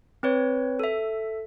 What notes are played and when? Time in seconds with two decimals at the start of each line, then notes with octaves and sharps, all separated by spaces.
0.23 C4 B4 C#5
0.79 A4 E5